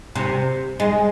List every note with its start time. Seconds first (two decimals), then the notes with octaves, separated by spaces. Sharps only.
0.15 C3
0.80 G#3